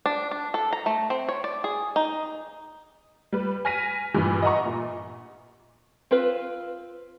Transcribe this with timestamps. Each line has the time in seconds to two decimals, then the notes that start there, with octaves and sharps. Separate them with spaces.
0.06 D4
0.31 D4
0.54 A4
0.73 A#5
0.86 A3
1.10 C4
1.29 C#5
1.44 D5
1.64 G#4
1.96 D#4
3.33 G3 B4
3.65 G#5 F6 A#6 B6 D#7
4.14 G2 A#2 E3
4.42 D#5 E5 F#5 A#5 C#6
4.65 A#2
6.11 C4 F4 B4